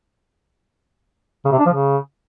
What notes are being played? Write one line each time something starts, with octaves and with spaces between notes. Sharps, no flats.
C#3
C3
D4
F3
C#3